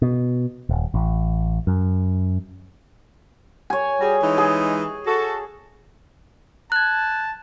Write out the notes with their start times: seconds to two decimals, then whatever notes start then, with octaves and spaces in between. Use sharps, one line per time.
0.02 B2
0.69 D#1
0.94 A1
1.67 F#2
3.70 C#5 G#5
4.00 G3 F#4 G#4
4.22 E3 G#3 D#4
4.38 G#4
5.07 F#4 A4
6.72 A5 F#6 G#6